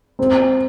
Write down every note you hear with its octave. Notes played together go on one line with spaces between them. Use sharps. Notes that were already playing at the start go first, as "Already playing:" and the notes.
C4